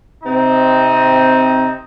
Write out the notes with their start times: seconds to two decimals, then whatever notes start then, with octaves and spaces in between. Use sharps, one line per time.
0.24 C3 C4 D#4